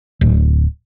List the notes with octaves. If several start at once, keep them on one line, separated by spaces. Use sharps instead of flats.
D1